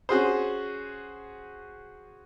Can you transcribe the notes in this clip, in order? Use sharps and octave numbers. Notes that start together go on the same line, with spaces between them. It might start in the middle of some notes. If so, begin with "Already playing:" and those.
C#4 F#4 G#4 C5